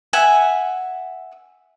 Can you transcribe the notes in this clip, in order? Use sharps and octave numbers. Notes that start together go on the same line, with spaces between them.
E5 F#5 G#5